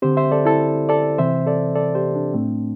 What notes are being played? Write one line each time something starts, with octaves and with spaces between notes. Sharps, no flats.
D3 C4 G4 C5
C5 E5
A4 D5
E4 A4
A4 D5
C3 E3 C4 C5 E5
A4 D5
A4 D5
G4 C5
D4
A2 A3 C4